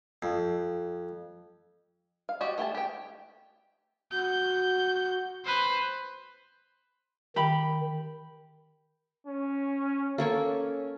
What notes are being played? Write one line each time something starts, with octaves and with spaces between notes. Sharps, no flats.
F2
F5
F#4 G4 D5 D#5
A3 G4 G#4 A5
G4 G5
F#4 G6
B4 C5
D#3 G4 B5
C#4
A#3 C#4 A4 C#5